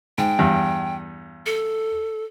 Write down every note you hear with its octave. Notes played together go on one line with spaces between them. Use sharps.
G#2 G5
E2 G2
A4